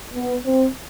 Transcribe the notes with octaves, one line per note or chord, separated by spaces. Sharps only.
B3
C4